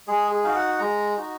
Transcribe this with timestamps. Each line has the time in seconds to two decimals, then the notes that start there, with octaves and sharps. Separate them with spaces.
0.08 G#3 G#4
0.31 G#4
0.44 D#4 F#4 F5
0.56 F#5
0.79 G#3 A#5
1.16 D#4 F#4